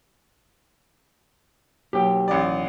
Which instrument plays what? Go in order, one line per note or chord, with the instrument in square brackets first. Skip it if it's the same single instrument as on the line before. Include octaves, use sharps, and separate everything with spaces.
[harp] D#2 B2 F#3 [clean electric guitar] G4 G5
[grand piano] A1 D5